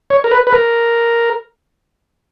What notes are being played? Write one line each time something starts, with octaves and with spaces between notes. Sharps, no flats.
C#5
A#4
B4
B4
A#4